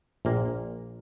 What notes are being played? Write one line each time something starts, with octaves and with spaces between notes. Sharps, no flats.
A#1 A#2 A#3